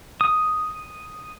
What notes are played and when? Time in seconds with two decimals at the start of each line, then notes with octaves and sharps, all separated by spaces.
0.21 D#6